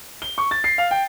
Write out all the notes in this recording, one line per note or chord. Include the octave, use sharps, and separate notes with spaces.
G7
C#6
A6
C7
F5
G5